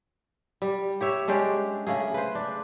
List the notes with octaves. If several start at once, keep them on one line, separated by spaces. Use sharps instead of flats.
G3
G4 C#5 E5
G#3 C#4 D4 G4
C#3 A3 G#4
B4 C5
D4